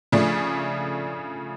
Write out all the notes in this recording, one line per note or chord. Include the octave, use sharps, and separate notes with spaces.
C#3 F3 A3 D4